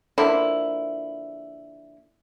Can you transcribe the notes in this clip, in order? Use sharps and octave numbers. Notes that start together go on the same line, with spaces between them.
D3 F3 A#3 E4